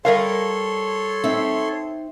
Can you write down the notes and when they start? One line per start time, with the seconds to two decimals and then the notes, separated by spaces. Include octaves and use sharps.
0.05 G3 A4 A#4 C#5 F5 C6
1.24 C4 D#4 E5